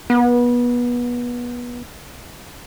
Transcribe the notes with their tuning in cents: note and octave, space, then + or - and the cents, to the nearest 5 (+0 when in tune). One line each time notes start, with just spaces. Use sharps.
B3 -25